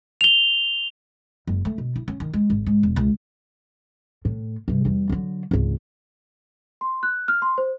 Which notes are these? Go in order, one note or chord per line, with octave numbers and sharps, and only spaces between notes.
F7 G7
F#1
A3
B2
E4
C#4
D#3
G#3
G#1
G#2
E1
C#2
A2
G2 C3
E2 G3
D3 F#3
G#1 C#2
C6
F#6
F6
C6
C5